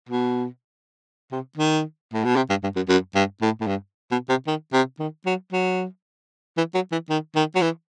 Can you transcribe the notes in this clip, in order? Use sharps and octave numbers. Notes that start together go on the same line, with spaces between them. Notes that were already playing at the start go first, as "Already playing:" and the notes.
B2
C3
D#3
A2
B2
C3
G2
G2
F#2
F#2
G2
A2
A2
G2
B2
C3
D#3
C3
D#3
F#3
F#3
E3
F#3
E3
D#3
D#3
F#3
E3